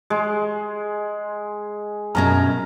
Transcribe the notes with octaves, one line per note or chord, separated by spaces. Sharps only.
G#3
F#2 B2 C#4 A#4 A#5